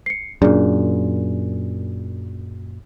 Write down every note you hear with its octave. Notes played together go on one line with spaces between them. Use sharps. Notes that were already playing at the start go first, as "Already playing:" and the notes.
C7 C#7
F#2 A#2 D4 G#4 D5